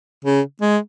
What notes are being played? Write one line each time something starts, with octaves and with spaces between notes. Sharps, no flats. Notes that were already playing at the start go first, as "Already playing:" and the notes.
C#3
G#3